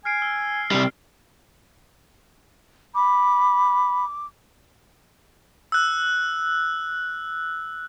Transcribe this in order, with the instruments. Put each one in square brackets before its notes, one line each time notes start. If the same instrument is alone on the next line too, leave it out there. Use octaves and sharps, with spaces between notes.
[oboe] G#5 [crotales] F6 C7 D7
[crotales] E6
[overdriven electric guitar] C3 G3
[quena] B5 [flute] D6
[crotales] E6 F#6